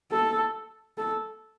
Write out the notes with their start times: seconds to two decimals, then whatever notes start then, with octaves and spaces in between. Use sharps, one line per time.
0.11 A4
0.98 A4